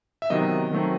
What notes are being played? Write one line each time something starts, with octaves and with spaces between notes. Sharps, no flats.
E5
C3 D#3 F#3 B3 D#5
D#3 F#3 A3 C4